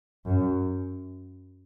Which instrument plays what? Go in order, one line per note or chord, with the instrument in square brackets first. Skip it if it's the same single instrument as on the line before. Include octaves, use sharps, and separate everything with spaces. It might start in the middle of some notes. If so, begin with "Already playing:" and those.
[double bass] F#2